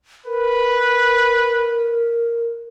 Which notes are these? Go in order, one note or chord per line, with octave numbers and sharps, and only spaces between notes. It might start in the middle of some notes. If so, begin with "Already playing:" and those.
A#4 B4